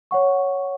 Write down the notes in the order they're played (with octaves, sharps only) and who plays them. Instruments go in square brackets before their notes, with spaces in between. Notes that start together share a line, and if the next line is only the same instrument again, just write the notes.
[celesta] C#5 F#5 C#6